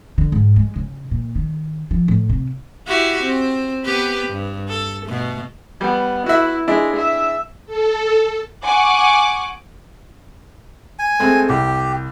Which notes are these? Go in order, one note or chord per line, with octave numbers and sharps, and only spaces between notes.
D3
G#2
G#3
C#3
A#2
D#3
F3
A2
C3
E4 F#4 G4
C4
B3 G4 B4
G2
A4
B2 A3
G3 B3
E4 F#4 E5
G#3 D4 E4
E5
A4
F#5 G#5 C#6 D6
G#5
G#3 A3 C4
C2 G4